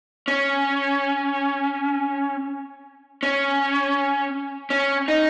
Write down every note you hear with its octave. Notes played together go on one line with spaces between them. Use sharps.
C#4
C#4
C#4
D#4